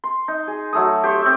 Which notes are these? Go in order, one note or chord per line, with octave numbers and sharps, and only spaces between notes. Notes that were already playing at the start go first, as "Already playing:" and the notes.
C6
D#4
G#4
F#3 A3 D#6
G4 C5 C#5
C4 E5